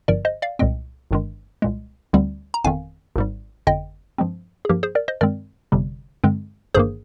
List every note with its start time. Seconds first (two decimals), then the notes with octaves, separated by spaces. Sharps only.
0.08 G1 G2 F3 A#4 D5
0.25 C5 D#5
0.42 D5 F5
0.59 C2 A#2 G#3 C4 D#5 G5
1.11 G1 G2 D#3 G#3
1.62 C2 A#2 G#3
2.13 D2 D3 G3 C4
2.54 A#5
2.64 G1 F2 D#3 F5 G#5
3.16 G#1 G#2 G3
3.67 G1 F2 D3 D#5 G5
4.18 G2 F3 G#3 C4
4.65 G#4
4.69 G2 F3 A#3 G4 A#4
4.83 G#4 C5
4.95 A#4 D5
5.08 C5 D#5
5.21 G2 D#3 G#3 C4 A#4 D5
5.72 G1 F2 C3 G3
6.24 G2 D3 G#3 C4
6.74 G1 G2 D#3 A#3 G#4 C5